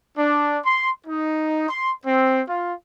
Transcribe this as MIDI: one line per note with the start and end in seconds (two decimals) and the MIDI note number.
0.15 0.58 62
0.65 0.90 84
1.06 1.69 63
1.69 1.91 84
2.05 2.41 60
2.48 2.73 65